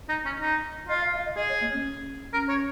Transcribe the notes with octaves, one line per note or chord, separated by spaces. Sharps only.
D#4
C#4
D#4
F4 D#5
F5
F5
D#5
G#4 D#5
C#5
A#3
C#4
C#4 A#4
C#5